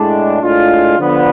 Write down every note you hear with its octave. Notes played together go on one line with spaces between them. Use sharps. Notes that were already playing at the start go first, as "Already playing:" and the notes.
Already playing: A2 G#3 D4
A2 G#3 D4 F4
D3 F3 B3